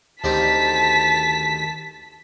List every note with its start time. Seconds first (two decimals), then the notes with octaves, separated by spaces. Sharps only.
0.24 D2 D#3 C4 G4 A5 B6